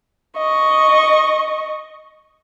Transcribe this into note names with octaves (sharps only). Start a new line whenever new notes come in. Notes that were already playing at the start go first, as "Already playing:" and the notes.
D#5 C#6